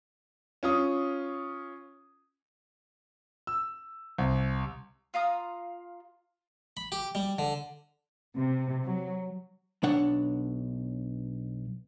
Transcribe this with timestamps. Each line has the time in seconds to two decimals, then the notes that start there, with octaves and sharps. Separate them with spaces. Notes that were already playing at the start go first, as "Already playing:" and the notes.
0.63 C#4 F4 D#6
3.47 E6
4.18 C2
5.14 F4 F5 A#5 D#6
6.77 B5
6.92 G4
7.15 G3
7.39 D3
8.36 C3
8.85 F#3
9.83 B1 D4 C#5 F#5